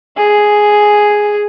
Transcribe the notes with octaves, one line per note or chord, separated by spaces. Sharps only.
G#4